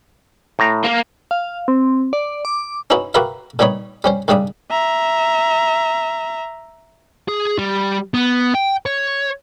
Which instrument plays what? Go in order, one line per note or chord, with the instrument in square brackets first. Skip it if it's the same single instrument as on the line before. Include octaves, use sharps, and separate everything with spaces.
[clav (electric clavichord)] A2 A#5
[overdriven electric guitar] A#3 A#4
[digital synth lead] F5
C4
D5
D6
[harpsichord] C#4 D#4 E4 F#4 B4
F#4 G4 A#4 B4 E5 F5
A#2 G3 B3 D#4 C#5 B5
G3 C#4 C5
C2 G#2 C#3 G3 D4 D#6
[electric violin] E5 A#5
[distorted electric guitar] G#4
G3
B3
G5
C#5